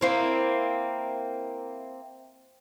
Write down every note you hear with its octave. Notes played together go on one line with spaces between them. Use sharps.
A#3 C4 E4